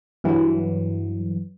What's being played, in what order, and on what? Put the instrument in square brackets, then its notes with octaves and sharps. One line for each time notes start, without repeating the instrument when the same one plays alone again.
[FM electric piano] G2 E3 F#3